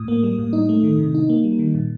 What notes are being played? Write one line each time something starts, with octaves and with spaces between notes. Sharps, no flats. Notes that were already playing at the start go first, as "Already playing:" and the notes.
Already playing: A2 D#6
A#3
G3
A2
D#4
A3
D#3
C3
D#4
A#3
G3
D#3
A#2